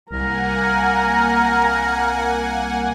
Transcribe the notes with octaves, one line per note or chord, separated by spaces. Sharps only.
C2 A#3 A#4 F#5 G#5 A#5